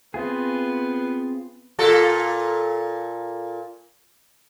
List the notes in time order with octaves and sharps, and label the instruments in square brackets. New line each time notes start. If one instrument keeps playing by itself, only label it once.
[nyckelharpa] B3 [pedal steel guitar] C4 F4 G#4
[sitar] A#2 F4 A4